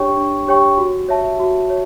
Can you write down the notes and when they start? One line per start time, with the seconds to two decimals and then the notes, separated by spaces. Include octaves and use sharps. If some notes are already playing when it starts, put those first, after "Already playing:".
Already playing: D4 G4 C#5 G5 C#6
0.17 D4
0.47 G4 C#5 G5 C#6
0.77 F#4
1.08 C#5 E5 A5
1.40 F#4
1.70 C#5